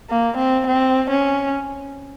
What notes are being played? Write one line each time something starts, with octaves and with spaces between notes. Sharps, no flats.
A#3
C4
C4
C#4